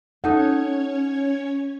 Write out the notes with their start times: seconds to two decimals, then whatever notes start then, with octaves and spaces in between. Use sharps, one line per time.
0.24 C#4 D#4 A4 C#5 F#5 G#6